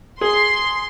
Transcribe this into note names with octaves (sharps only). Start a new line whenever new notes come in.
G#4 C6